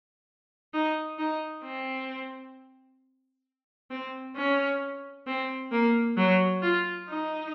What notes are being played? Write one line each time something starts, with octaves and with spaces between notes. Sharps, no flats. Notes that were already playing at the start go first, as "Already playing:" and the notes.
D#4
D#4
C4
C4
C#4
C4
A#3
F#3
F4
D#4